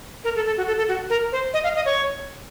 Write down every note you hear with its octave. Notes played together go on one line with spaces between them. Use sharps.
A#4
A4
A4
F#4
A4
A4
F#4
A#4
C5
D#5
F5
D#5
C#5